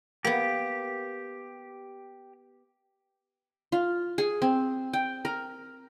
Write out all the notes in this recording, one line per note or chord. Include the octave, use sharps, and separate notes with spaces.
A#3 B3 G4
F4
G#4
C4
G5
A#4